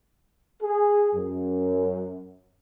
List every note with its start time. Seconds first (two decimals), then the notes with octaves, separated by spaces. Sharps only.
0.62 G#4
1.13 F#2